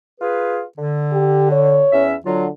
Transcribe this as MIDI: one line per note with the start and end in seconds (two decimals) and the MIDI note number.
0.21 0.63 65
0.21 0.63 68
0.21 0.63 71
0.78 1.85 50
1.12 1.51 67
1.51 2.05 73
1.93 2.15 40
1.93 2.15 61
1.93 2.15 76
2.26 2.49 50
2.26 2.46 54
2.26 2.46 65